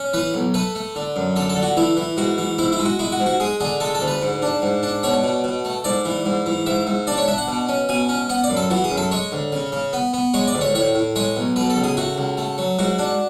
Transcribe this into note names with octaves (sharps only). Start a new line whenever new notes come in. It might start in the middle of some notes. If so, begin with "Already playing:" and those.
Already playing: C#4
E3 B4
B1
A3 B4
A3
D3
F#2
D3 A4
A4
D3
F#4
E3 E4
E3
G#2 F#4
E3
G#2 E4
E4
G#3
F#4
G#3 E4
F#4
G#2
F#4
G#3 G#4
D3 G#4
G#3 A4
A4
D2
B4
G#2
D4
G#2
D4
B2 C#5
B2
B2
A3
G#2 D5
E3
G#2
E3
G#2 E5
G#2
D4 D5
C#5
D4 E5
F#5
B2
C#4
B2 G#5
C#4
B3 F#5
D5
F#2
A4
E3 F#4
G#4
F#2
A4
G#3 C#5
D2
C#3
C#3
B3
B3
G#3 C#5
D5
D2
C#5
A2 C#5
A2
G#3 C#5
B1
B2 B4
A4
C#2
G#4
A3 F#4
C#2
A3
F#3
G#2 F#4
D4